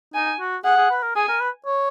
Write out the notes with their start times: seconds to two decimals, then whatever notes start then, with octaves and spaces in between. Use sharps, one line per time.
0.14 D#4 G#5
0.39 F#4
0.64 G#4 F#5
0.78 G#4
0.90 B4
1.02 A#4
1.16 G#4 G#5
1.28 A#4
1.40 B4
1.66 C#5